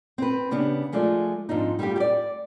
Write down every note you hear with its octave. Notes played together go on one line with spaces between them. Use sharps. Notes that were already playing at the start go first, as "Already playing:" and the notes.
C4 B4
C#3 B3 D4 G4
F3 G#3 A3 D5
F2 G#2 D4 D#4
G3 A3 E4 F4 G4
G4 D5